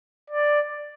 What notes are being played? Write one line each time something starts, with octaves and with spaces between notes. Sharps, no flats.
D5